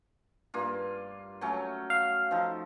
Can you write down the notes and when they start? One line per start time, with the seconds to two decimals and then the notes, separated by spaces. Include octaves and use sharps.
0.54 G2 A#3 F4
1.41 F#3 A3 C#4
1.90 F5
2.31 F3 D#4 A4